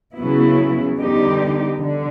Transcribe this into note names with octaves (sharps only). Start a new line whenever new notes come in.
C#3 F#3 B3 E4
D3 G3 B3 D#4 G4
D3